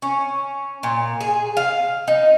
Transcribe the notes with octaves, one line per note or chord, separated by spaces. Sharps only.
C#4
A#2
G#4
F5
D#4